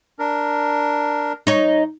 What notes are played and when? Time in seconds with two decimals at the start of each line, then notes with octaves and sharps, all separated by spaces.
0.19 D4 A#4
1.47 D#4 C#5